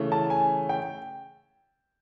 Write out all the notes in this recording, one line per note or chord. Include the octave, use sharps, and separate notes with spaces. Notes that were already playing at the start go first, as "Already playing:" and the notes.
Already playing: C#3 E3 A3
A5
G#5
G5